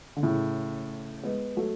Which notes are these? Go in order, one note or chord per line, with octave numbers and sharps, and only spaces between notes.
D3
A2 C#3
G#3 B3
F#3 A3